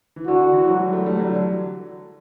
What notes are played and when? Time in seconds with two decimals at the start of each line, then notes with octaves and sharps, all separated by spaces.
0.16 E3
0.27 D3 F#4
0.41 D3
0.53 E3
0.67 F#3
0.79 G3
0.93 A3
1.06 G3
1.19 F#3
1.27 D3